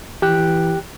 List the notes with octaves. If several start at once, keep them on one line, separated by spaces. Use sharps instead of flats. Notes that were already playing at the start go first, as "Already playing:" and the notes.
E3 G4 G5 F#6